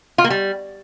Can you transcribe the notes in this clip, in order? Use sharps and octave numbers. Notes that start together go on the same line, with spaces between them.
F4
A#3
G3